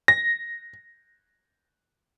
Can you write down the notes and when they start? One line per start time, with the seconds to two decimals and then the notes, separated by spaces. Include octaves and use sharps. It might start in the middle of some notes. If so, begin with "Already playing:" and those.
0.08 A#6